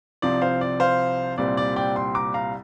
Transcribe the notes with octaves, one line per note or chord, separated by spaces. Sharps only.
C2 C3 F3 C4 D5
C5 F5
D5
C5 F5
C2 A#2 G3 C4 D5
D5
D5 G5
G5 C6
A#5 D6
F5 A#5